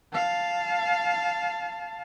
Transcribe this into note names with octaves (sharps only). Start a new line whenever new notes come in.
F5 A5